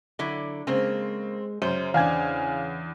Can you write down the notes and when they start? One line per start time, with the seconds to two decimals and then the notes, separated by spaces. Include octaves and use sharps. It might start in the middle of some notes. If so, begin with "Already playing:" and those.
0.19 D3 F#3 E4
0.67 C#3 G#3 A#3 C4
1.62 F#2 C#3 C5
1.94 E2 D4 F5 G#5 G#6